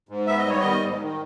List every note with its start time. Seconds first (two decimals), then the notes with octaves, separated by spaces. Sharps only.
0.09 G#2
0.27 B3 E5
0.38 D#5
0.45 G3 C#5
0.61 D#3 D#5
0.83 G#2
1.01 D#3